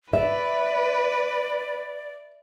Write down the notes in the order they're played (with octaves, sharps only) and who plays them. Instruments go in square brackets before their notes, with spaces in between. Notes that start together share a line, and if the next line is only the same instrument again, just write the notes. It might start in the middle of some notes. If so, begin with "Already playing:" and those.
[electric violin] B4 [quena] D5 [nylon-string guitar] E5